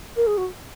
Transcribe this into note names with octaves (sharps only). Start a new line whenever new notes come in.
A#4
G#4
F#4